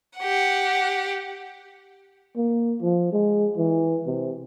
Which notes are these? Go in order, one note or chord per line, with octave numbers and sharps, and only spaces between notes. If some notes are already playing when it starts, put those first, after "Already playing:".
G4 F#5
A#3
F3
G#3
E3
C3